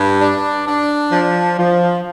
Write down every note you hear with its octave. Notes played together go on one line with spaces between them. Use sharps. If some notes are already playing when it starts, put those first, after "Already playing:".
Already playing: G2
D4
D4
F3
F3